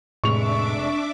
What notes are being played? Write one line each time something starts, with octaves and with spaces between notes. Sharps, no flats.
F1 A2 G#3 D4 E5 C#6 D6 F7